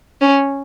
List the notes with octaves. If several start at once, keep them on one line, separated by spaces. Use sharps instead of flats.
C#4